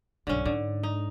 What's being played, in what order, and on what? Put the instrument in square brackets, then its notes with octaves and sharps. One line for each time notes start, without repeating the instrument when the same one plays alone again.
[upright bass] B1 G2 [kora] D3 C#4
[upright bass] G#2 [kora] D3
[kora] D#4